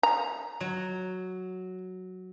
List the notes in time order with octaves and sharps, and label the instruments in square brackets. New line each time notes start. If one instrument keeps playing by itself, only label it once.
[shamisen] A#5
[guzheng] F#3